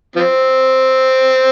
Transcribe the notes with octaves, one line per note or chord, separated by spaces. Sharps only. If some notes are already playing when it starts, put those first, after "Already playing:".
F3 C4